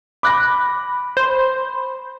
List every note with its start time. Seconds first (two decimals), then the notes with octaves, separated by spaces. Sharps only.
0.23 B5 D6 F#6 A#6
1.17 C5